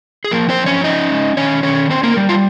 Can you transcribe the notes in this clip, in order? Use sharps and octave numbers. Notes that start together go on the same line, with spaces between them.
G#4
F3 A#3 A#4
C4 C5
F3
C#4 C#5
C#4 D#4 D#5
G#3
D#3 C#4 C#5
D#3 C#4 C#5
C4 C#4 C5
A#3 A#4
G3
F4